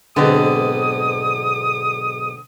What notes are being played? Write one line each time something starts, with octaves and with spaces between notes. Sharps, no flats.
B1 G#2 D3 B3 C4 D#6